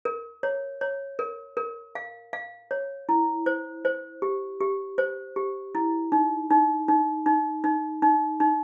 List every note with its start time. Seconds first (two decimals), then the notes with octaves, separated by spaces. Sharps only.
0.05 A#4
0.43 C#5
0.81 C#5
1.19 A#4
1.57 A#4
1.95 F5
2.33 F5
2.71 C#5
3.09 E4
3.46 C5
3.85 C5
4.22 G4
4.61 G4
4.98 C5
5.36 G4
5.75 E4
6.12 D#4
6.50 D#4
6.88 D#4
7.26 D#4
7.64 D#4
8.02 D#4
8.40 D#4